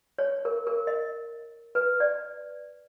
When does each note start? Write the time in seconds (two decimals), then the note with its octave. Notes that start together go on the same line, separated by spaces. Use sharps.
0.19 C#5
0.45 A#4
0.67 A#4
0.87 D#5
1.75 B4
2.00 D5